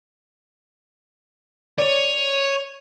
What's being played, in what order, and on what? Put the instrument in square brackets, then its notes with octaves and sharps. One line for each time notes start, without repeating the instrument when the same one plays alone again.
[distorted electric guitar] C#5 [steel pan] D5 [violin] D#7 F7